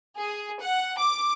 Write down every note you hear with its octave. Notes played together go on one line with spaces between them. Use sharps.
G#4
F#5
D6